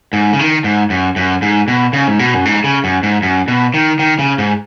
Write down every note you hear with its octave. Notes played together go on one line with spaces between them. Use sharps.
G#2
C#3
D#3
G#2
F#2
F#2
G#2
B2
C#3
G#2
B2
F#2
G#2
C#3
F#2
G#2
F#2
B2
D#3
D#3
C#3
G#2